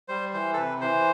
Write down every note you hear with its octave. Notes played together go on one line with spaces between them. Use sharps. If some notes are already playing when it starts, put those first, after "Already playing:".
G3 C5
E3 C5
A4
C3 B4
E3 C5